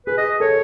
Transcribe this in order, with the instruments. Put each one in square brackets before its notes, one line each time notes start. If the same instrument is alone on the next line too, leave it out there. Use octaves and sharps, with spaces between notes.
[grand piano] G#4 [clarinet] B4
[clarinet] D#5
[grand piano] A4 [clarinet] C#5